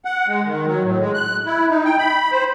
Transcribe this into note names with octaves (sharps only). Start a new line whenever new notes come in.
F#5
G#3
D#3
F#3
A2
G#3
F#6
E4
D#4
G5
B5
C5